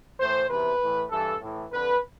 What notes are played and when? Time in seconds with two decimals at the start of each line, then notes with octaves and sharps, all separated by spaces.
0.20 A2 E3 C5
0.49 E2 C3 E3 B4
0.81 A2 E3
1.10 G2 E3 A4
1.41 A2 E3
1.72 F2 D3 B4